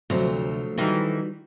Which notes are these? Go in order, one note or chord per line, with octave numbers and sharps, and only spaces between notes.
D2 C3 F3 F#3 A3 C4 A5
D#3 E3 G3 D#4 F#4